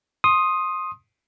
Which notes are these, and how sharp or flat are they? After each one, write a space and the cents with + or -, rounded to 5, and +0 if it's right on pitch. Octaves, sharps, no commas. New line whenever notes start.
C6 +20 D#6 +0